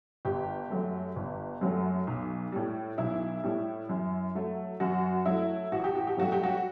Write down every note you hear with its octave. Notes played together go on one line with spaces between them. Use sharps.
G1 G4
F#2 F#3 A3
G1
F#2 F#3 A3
B1
A2 G3
B1 E4
A2 G3
F#2
F#3 A3
F#2 F#4
F#3 A3 E4
A1 F#4
G4
F#4
G4
G2 F#3 A3 F#4
G4
F#4